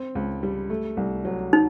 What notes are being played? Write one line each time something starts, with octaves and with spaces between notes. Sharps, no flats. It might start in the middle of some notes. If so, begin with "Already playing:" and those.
Already playing: C4
C#2
G3
A3
C2
F#3
D#4